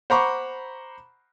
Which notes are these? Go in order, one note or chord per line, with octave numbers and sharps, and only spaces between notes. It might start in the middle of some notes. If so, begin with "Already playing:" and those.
C5 F#5 A#5 B5 C#6 D6